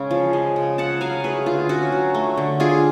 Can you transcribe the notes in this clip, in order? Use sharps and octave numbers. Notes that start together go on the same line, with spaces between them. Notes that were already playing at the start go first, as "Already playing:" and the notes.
Already playing: C#3 G#3 C#4
F3
G#3
C#3
C#4 F#5 A5
F#3 F5 G#5
A3 G#4 B4
D3 F4
C#4 F#4
F#3
A3
D3
D4 F4 G#4